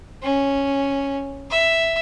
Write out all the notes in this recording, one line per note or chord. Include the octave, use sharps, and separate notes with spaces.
C#4
E5